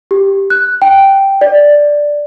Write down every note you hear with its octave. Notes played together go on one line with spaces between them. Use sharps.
G4
F#6
G5
D5